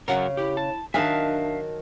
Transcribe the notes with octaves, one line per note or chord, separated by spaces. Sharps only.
F#2 C#3 F#4 A#4 F#5
E4 G4
A5
D#3 F#3 D4 E5 F5 G#5 A5